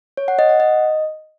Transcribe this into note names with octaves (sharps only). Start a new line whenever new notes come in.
C#5
F#5
D#5
F#5
D#5